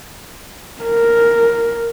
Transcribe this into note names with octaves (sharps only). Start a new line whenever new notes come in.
A#4